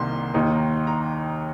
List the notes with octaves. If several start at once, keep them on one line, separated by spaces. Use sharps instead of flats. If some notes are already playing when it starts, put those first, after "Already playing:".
Already playing: C2 C3 D#3 A#3 C6
D#2 D#3 A#3 D#4
A#5